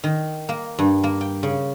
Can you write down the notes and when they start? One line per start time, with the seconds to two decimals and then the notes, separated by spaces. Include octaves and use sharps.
0.04 D#3
0.49 A#3
0.79 G2
1.03 A#3
1.21 G5
1.43 C#3